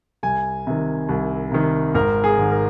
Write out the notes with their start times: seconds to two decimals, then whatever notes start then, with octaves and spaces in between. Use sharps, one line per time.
0.23 C2 G#5
0.67 C3 D#3
1.09 C2
1.52 C3 D#3
1.95 G#1 A#4
2.24 G#4
2.38 G#2 D#3
2.52 A#4